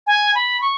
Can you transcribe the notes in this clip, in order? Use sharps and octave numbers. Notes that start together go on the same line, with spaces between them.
G#5
B5
C#6